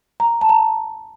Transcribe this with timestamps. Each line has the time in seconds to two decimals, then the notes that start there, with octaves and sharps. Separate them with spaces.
0.20 A#5
0.41 A5
0.49 A#5